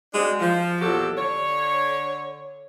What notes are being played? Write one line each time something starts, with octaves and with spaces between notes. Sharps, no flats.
G#3 C4 D4 F#4 D#5
F3
E2 A#2 F#3 G4 A4
D3 C#5